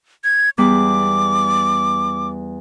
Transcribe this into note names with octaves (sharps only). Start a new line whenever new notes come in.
G#6
E2 G3 D6